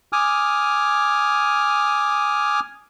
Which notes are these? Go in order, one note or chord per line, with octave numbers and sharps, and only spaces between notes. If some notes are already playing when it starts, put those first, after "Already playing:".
G#5 D6 D#6 F6